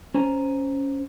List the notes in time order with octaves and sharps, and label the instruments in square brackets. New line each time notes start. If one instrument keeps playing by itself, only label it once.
[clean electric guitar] C#4 C5 G#5 A#5